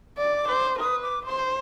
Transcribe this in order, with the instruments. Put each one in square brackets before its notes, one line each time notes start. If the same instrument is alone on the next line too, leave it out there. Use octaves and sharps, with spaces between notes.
[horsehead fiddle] D5
[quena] D6
[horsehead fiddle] C5
[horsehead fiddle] B4 [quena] D#6
[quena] D6
[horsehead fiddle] C5 [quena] C6